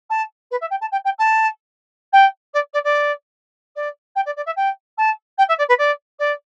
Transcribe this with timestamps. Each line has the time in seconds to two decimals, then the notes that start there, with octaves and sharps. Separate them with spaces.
0.09 A5
0.51 B4
0.60 E5
0.70 G5
0.81 A5
0.91 G5
1.04 G5
1.18 A5
2.12 G5
2.53 D5
2.73 D5
2.84 D5
3.75 D5
4.15 G5
4.25 D5
4.36 D5
4.46 E5
4.56 G5
4.97 A5
5.38 G5
5.48 E5
5.58 D5
5.68 B4
5.78 D5
6.19 D5